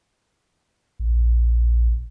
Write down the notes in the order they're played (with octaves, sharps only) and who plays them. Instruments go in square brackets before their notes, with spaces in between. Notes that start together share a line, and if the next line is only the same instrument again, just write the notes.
[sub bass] A#1